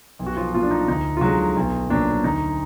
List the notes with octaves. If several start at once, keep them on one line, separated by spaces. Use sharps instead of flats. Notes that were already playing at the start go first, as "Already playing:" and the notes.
B1
F#4
F3 F4
A#2 F3 F4
D4
D#4
D2 D#4
F4
D3 F#3 G#3 F#4
B1
A#2 F#3 D4
D2 D#4